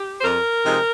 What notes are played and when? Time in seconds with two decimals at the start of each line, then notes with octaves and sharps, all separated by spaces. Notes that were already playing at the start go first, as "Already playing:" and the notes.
Already playing: G4
0.20 C5
0.24 F2 A#4
0.64 C3 F3 G#3 D#4